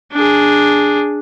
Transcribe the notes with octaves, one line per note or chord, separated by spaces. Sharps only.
D4 G#4